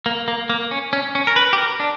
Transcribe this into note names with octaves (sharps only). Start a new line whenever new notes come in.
A#3
A#3
A#3
C#4
C#4
C#4
A#4
B4
G4
A#4
D4